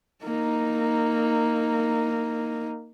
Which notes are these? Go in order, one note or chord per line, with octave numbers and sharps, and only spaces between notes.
A#3 D#4